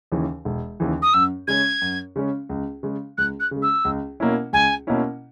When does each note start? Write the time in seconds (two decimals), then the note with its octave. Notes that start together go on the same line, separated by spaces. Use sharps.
0.12 D#2 C#3 E3
0.45 E1
0.80 D#2 C#3 E3
1.02 D#6
1.14 F#2 E6
1.48 C#3 G#3 C#4 G#6
1.82 F#2
2.16 C#3 G#3 C#4
2.49 C#2
2.83 C#3 G#3
3.18 C#2 F#6
3.40 F#6
3.51 C#3
3.56 G#3
3.63 E6
3.85 C#2
4.20 B2 A#3 C#4 E4
4.53 C#2 G#5
4.87 B2 A#3 C#4 E4